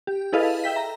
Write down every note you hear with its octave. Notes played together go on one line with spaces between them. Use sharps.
G4
E4 G#4 A4 B4 D#5 F5
E5 G5 B6
A#5